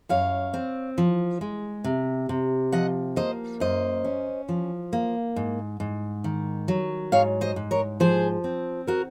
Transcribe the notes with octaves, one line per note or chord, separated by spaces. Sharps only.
F#2 C#5 F5
C4
F3
G#3
C3
C3
F3 D#5 F#5
A#3 C5 D#5
F#2 C5 D#5
C#4
F3
A#3
G#2
G#2
D#3
F#3
G#2 C#5 F5
C5 D#5
G#2
A#4 C#5
F3 G#4 C5
C4
F#4 A#4